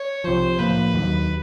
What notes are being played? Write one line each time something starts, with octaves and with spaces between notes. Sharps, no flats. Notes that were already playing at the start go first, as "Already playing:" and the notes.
Already playing: C#5
C2 C3 F3 C5
A2 F3 A#3 B4
D#2 D#3 F#3